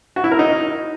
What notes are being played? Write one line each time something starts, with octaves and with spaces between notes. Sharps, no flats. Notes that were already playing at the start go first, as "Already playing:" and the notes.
F#4
E4
A#4
D#4